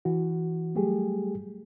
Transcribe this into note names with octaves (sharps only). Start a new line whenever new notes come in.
E3 F#4
F#3 G3 A3 G4 G#4